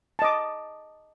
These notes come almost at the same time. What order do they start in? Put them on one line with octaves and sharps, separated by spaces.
A5 D#5 D6